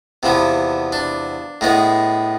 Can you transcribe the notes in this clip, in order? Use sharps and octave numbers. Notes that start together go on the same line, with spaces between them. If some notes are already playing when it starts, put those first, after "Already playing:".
E2 C3 F3 B3
D4
A2 G#3 B3